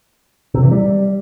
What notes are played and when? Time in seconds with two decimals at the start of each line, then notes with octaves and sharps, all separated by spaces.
0.54 C3
0.63 E3
0.72 G3